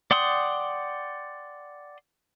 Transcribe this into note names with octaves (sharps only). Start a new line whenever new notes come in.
D5 F#5 G5 C6 D#6